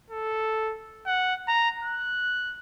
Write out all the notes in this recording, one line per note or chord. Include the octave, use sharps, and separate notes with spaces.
A4
F#5
A#5
F#6